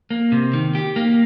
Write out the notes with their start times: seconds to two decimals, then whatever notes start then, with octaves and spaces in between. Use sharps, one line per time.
0.11 A#3
0.32 C3
0.53 D#3
0.75 G4
0.96 A#3